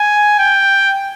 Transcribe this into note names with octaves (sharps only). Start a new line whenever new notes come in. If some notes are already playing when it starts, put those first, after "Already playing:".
Already playing: G#5
G5